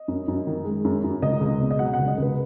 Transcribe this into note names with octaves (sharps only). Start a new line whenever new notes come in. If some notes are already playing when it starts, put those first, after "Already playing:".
Already playing: D#5
F#2
F#2
D#3
G#3
F#2
F#2
C#2 D#5
C#2
B2
D#5
F#3 F#5
F#5
C#2
D#5
C#2 B4